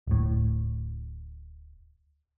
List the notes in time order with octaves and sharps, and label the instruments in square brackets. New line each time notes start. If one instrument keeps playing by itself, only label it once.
[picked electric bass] D1 A2